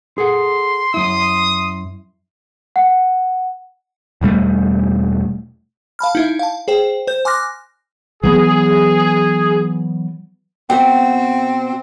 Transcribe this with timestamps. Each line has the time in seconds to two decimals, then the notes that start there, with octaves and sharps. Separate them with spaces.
0.18 G#4 A4 F#5 C6
0.94 F#2 E4 D#6
2.76 F#5
4.21 E1 B2 G3 A3
5.99 F5 A5 B5 F6
6.15 D#4 E4 E5
6.39 F5 A5
6.68 G#4 C5 G5
7.07 C5 G6
7.25 G#5 C6 D6 F6 F#6 A#6
8.23 E3 F#3 B3 G#4
10.70 B2 C4 F#4 G5